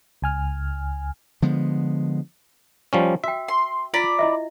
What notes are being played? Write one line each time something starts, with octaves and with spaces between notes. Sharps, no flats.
C#2 G#5 F6
D3 F3 G#3 B3
F3 G3 C#4
F#4 E5 G5
C6
F4 D5 A#5 B5
E4 D#5 E5